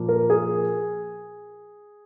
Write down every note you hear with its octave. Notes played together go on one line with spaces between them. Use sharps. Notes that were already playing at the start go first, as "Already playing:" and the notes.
Already playing: A#2 F3 A#3
A#4
G#4